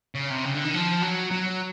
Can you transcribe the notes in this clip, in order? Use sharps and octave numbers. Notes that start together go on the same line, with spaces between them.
C#3
C3
C#3
D3
D#3
F3
F#3
F#3